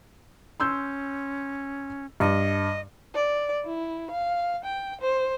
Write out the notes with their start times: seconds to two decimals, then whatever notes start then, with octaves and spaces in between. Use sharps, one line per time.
0.60 C#4 C6 E6 G6
2.20 G2 D#5
3.15 D5
3.65 E4
4.11 F5
4.64 G5
5.01 C5